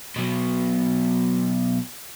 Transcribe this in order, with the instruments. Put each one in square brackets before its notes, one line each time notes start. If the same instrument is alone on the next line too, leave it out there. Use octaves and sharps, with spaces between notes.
[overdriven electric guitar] B2 F#3